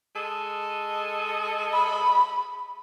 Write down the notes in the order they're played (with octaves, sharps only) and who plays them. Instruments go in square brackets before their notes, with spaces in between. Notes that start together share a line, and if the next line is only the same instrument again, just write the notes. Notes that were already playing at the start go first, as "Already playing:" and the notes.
[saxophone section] G#3 A4 D#5
[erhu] B5